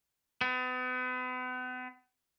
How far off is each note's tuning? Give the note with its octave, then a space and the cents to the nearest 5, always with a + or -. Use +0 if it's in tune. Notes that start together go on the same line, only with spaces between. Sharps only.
B3 +40